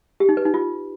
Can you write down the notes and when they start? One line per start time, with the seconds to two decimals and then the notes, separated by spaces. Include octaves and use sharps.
0.20 G4
0.29 D#4
0.37 B4
0.45 D#4
0.54 F4